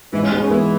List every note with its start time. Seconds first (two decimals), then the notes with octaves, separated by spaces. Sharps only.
0.13 G#2 E3
0.22 C#3
0.32 B2 G#3
0.41 C#3
0.50 E3 B3